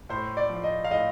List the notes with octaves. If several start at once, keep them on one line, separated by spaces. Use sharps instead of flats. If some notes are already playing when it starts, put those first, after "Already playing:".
A2 C5
D5
F3
D#5
F5
A2 D#5